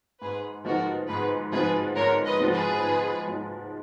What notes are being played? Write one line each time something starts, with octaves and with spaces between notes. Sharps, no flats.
G#2 G#4 B4
F3 G#3 B3 D#4 F#4 A#4
G#2 G#4 B4
F3 G#3 B3 D#4 G#4 B4
G#2 A#4 C#5
B4 D#5
F3 G#3 B3 D#4
G#4 B4
G#2
F3 G#3 B3 D#4